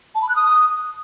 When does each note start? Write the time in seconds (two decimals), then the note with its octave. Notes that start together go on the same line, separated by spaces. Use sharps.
0.15 A5
0.22 B5
0.29 F#6
0.36 D#6